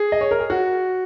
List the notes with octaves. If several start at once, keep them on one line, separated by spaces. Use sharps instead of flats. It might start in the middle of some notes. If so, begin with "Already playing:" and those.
Already playing: G#4
D#5
C#5
A#4
G#4
F#4